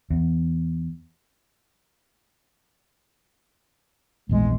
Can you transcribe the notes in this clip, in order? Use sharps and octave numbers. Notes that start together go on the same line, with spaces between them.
E2
A#1 E2 G#2 G#3